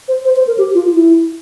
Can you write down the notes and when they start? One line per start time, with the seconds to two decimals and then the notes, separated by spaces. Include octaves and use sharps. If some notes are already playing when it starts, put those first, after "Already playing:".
0.08 C5
0.25 C5
0.36 C5
0.47 A#4
0.58 G4
0.75 F4
0.92 E4